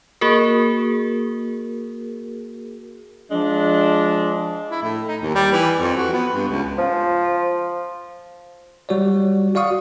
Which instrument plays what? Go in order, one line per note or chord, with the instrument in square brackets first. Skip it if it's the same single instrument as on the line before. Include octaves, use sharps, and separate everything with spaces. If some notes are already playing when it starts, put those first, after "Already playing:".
[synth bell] A#3 F#4 G#4 A#4
[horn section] F3 G#3 D4
[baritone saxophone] E4
A2
D#4
D#2
G3
E3
F2
F#4
B3
G2
C#2
[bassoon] F3
[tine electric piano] G3 F#4 C#5 D5
F#4 D5 F5 C#6 D#6